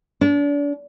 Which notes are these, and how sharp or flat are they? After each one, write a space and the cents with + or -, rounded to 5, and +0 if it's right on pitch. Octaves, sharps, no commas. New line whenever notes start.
D4 -35